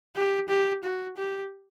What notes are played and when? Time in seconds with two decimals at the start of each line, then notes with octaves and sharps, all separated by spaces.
0.15 G4
0.48 G4
0.83 F#4
1.16 G4